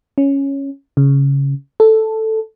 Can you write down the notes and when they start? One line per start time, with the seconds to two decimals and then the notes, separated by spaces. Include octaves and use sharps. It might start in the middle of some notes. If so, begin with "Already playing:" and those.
0.18 C#4
0.97 C#3
1.80 A4